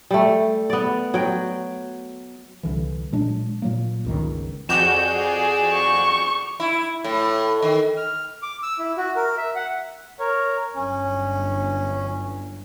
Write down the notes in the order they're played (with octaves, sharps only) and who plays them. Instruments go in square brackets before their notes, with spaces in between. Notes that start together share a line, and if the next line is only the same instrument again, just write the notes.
[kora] G3 A3
B3 D5
F#3 G5
[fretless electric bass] C2 D3 E3
A#2 F#3 G#3 D4
A#2 F#3 A#3
G1 C#2 D#3
[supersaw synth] F2 F#4 G6 [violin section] G#4 D5 [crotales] D6 E7
[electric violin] C#6
[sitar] E4
A2
D#3
[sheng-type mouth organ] F6
D6
E6
E4
F#4
A#4
E5
F#5
A#4 C#5
[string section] G1 F#3 [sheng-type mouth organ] C#4